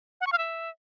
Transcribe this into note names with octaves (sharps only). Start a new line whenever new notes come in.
F#5
C#6
F5
E5